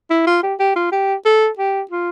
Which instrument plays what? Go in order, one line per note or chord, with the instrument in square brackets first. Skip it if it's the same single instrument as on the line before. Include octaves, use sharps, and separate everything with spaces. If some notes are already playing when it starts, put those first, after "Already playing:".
[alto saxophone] E4
F4
G4
G4
F4
G4
A4
G4
F4